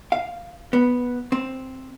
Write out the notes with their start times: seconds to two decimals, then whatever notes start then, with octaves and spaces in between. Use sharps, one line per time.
0.12 F5
0.73 B3
1.32 C4